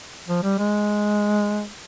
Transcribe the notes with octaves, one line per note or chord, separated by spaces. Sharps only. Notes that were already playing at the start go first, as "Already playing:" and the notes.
F3
G3
G#3